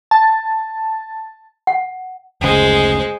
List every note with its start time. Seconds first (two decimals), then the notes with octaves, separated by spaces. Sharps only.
0.11 A5
1.67 F#5
2.41 F#1 D2 C#3 G#3 C5